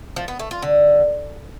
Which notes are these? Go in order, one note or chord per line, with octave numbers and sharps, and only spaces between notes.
F3
B3
A3
F4
D3